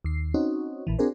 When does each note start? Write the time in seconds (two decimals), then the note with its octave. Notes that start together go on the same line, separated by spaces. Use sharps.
0.05 D#2 C7
0.34 C4 C#4 D#4 F#4
0.87 A#1 A#2 E3
0.99 C4 D4 F#4 G#4 A#4 C5